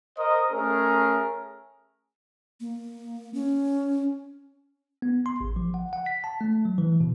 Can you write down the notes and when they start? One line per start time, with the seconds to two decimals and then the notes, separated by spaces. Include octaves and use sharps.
0.17 A#4 C5 D#5
0.51 A3 C#4 G#4 A#4
2.61 A#3
3.34 C#4
5.02 B3
5.26 C6
5.41 A1
5.56 F3
5.74 F#5
5.93 F#5
6.06 B6
6.24 A5
6.41 A3
6.65 F#3
6.78 E3
7.01 B2